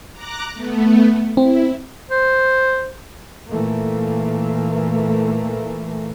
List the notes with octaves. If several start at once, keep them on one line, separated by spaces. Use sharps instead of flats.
A#5 D6 F#6
A3 B3
C4 E4
C5
A#2 E3 A3 A#3